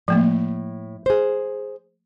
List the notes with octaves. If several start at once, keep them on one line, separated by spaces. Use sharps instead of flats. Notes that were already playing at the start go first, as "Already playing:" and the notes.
A2 F3 A3 A#3
G#4 C5